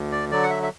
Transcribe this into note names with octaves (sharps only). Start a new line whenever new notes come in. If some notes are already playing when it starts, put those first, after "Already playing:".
Already playing: D2
D5
D3 F#3 D5
F#5
E5
E5